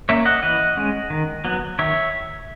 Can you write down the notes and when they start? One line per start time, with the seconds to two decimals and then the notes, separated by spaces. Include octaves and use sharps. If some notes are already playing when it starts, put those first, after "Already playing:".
0.09 A#3 C#4 C#5 E5
0.25 D#5 F#5
0.43 E3 D#5 F#5
0.77 G#3 C#4
1.10 D#3
1.45 F#3 B3
1.79 D#3 C#5 E5